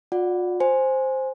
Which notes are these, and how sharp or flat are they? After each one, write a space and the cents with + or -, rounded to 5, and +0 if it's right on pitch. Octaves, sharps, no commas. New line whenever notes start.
F4 +40 D5 +0 F#5 +0
C5 +5 G#5 +0